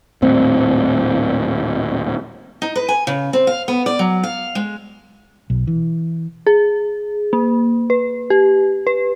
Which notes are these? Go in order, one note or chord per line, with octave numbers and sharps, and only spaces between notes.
D#1 A2 C4
D#4
B4
G#5
C#3
C4
F5
B3
D5
F#3
F5
G#3
B1
E3
G#4
A#3
B4
G4
B4